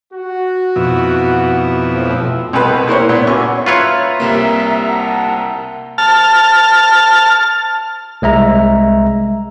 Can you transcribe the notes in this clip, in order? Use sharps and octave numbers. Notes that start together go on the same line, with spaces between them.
F#4
F2 B2 E4
B1 A2 F3
C2 B2 B4
A#3 E4 C5 C#5
A#2 B3
C#2 C#4 F#4 E5 C#6
F4 B4 C#5 E5 A#5 C#6 E6
C2 C3 A#3
F#5 A5 A#5
A5 F6
C2 G#3 E5 A#5